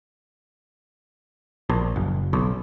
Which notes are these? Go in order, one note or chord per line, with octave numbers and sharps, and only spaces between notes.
A#1
F#1
B1